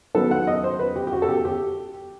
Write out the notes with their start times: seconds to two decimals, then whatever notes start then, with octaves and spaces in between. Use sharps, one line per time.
0.15 D#3 F#3 B3 A4
0.31 F#5
0.47 D#5
0.64 C5
0.79 B4
0.96 G4
1.07 G4
1.13 F#4
1.22 A4
1.29 G4
1.45 G4